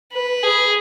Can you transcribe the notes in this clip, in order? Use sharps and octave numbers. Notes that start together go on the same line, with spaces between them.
B4
G#4